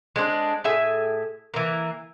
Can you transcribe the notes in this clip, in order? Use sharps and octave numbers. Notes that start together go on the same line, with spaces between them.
G#3 C4 D4
A2 G#4 E5 G#5
E3 A#3